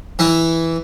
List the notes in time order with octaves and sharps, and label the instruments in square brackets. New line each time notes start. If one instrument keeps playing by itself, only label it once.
[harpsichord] E3 E4